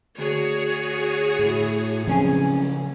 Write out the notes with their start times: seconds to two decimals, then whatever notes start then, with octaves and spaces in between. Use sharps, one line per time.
0.18 D2 F#4 G#4 C#5
1.39 A2
2.07 C#3 F3 F#3 C4 C#4 G#4